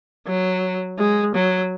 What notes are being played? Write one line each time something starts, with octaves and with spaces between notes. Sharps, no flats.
F#3
G#3
F#3